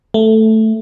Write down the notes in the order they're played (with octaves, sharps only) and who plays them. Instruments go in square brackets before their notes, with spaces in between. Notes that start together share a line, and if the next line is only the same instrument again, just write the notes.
[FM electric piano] A3